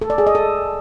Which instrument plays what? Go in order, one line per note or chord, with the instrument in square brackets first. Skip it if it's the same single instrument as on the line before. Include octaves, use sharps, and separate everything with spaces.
[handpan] A4
D5
G#4
D#5
A4